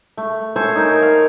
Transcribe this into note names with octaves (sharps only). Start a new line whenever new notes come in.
A3
A4 C5 C#5 G#5
D#4 A#4
F5